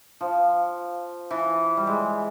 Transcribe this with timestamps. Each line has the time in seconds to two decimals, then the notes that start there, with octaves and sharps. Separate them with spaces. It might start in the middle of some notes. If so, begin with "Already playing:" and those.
0.21 F3
1.31 E3
1.77 G3
1.87 G#3